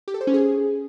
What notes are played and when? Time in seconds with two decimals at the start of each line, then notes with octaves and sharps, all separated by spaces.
0.08 G4
0.14 A4
0.21 C5
0.27 C#4
0.34 G#4